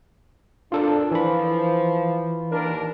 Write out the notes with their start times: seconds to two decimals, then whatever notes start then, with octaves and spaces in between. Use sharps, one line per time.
0.72 D4 F4 A4 A#4
1.12 E3 F3 B5
2.51 D#2 D4 A#4